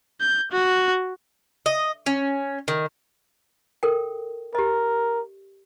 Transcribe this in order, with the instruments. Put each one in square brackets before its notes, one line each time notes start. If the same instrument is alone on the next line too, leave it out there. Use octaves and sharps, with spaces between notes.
[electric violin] G6
F#4
[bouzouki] D#5
C#4
D#3
[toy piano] A4 A#4 G5
[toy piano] G4 D#5 [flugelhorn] A#4